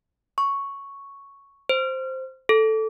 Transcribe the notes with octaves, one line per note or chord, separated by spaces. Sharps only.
C#6
C5
A4